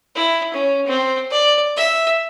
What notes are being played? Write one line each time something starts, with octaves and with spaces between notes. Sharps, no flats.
E4
C#4
C4
D5
E5